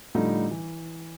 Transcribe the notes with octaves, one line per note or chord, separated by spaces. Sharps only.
A2 D3 F3 G3 D#4
E3